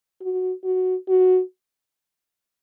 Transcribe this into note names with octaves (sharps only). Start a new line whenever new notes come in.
F#4
F#4
F#4